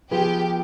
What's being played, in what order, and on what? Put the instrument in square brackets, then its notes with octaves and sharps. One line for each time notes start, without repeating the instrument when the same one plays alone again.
[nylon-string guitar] F3 B3 F4 G#4 B4 [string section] G4